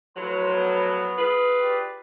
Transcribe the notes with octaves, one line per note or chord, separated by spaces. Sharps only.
A2 F3 F#3 B4 C6
B3
F4 G#4 B4
G4 D5